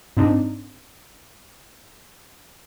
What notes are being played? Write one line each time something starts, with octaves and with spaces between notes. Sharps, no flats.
G#2 C4 D4 D#4